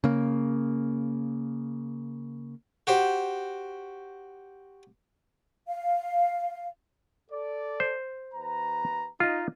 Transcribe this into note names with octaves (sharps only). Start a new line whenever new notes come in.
C#3 A#3
F#4 G4 C5
F5
A4 D5
C5
D#2 B4 A#5
D#4 F4 D#5